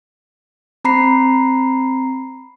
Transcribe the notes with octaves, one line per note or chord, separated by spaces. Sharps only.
C4 A#5 B5 C7